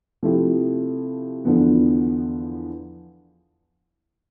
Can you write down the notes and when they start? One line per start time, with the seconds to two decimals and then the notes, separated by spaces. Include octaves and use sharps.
0.23 C3 F3 A3 E4 G4
1.45 E2 D3 F3 B3